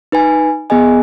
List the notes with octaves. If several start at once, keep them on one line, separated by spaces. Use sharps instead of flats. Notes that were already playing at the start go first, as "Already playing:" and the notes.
D#4 B4 G#5
B3 G#4 D#5 G#5